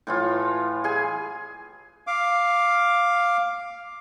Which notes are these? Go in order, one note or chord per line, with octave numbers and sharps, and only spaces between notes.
A2 E3 F4
G#4 G#5
F5 D6